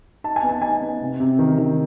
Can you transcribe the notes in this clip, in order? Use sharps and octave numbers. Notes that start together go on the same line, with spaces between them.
D#4 A5
G#5
B3
A5
D#4 G#5
B3
C3
C3
D#3
D#3